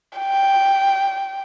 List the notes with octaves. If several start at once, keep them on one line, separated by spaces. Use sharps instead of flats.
G5